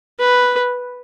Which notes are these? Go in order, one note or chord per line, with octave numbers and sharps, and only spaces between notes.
B4